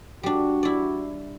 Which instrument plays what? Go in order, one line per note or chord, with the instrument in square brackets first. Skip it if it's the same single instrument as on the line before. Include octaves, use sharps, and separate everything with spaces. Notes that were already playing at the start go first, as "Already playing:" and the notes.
[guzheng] G3 D4 [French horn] F#4
[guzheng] E4 D5